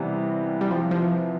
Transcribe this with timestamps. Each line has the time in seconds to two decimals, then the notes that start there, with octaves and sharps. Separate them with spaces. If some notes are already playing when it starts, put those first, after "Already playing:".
Already playing: C3 E3 G3 B3
0.61 G3
0.71 F3
0.91 F3